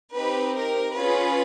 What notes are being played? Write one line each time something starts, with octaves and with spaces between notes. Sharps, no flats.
C4 D#4 G4 B4
A#4
C#4 F4 G#4 B4